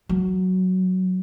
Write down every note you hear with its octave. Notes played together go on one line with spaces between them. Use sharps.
F#3